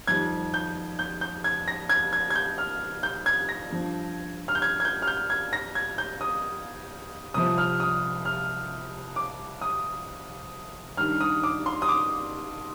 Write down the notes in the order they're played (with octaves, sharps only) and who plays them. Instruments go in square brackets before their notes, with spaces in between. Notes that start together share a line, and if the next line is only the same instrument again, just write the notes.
[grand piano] F2 D#3 G3 G#6
G6
G6
G6
G#6
A#6
G#6
G#6
G#6
G6
F6
G6
G#6
A#6
G2 F3
F6
G6
G#6
G#6
G6
F6
G6
G#6
A#6
G#6
G6
D#6
C2 C3 F3 D#6
F6
D#6
F6
D6
D#6
G2 D#3 G3 F6
D#6
D6
C6
D#6
D6